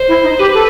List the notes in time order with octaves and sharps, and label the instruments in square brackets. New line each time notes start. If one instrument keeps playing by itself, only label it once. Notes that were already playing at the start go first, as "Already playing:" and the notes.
Already playing: [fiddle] C5
[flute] E4
D#4
[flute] G4 [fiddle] B4
[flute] A4